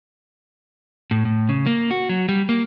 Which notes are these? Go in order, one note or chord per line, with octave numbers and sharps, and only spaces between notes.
A2
A2
C#3
A#3
F#4
F#3
G3
A#3